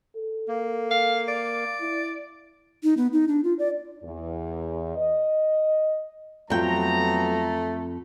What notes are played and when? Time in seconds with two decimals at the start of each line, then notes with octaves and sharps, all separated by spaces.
0.16 A4
0.48 A#3
0.91 F5
1.28 D5
1.81 E4
2.83 D#4
2.97 B3
3.13 D#4
3.28 D4
3.44 F4
3.59 D5
4.03 E2
4.96 D#5
6.50 F2 F#3 A3 B3 G5 A#5